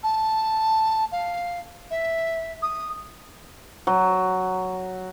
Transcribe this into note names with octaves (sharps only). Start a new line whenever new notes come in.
A5
F5
E5
D#6
F#3